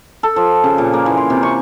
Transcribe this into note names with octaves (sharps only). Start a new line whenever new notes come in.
A4
F3
C#3
A#2
A#3
E3
C6
C3
C#6